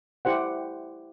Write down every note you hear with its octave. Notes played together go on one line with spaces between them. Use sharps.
E4 G4 C5 F#5